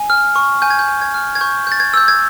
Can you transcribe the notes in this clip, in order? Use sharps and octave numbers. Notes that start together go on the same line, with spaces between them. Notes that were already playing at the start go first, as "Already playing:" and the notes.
Already playing: G#5
F6
C#6
G#5 G6
G#6
G6
G#5
G#6
F6
G#6
C#6 G6
G6 A6
G#6
E6 G6
G#6